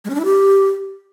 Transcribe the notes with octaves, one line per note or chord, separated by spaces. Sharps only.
G#3
C#4
D4
E4
G4